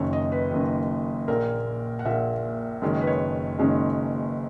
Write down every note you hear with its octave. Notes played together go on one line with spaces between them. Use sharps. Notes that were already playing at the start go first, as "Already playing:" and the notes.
Already playing: F#1 F#2 D#3 C#5
D#5
B4
F#1 F#2 D#3
A#1 A#2 A#3 A#4
F#5
A#1 A#2 A#3 E5
F#1 F#2 D#3 G#3 C#4
B4
C#5
F#1 F#2 D#3 G#3 C#4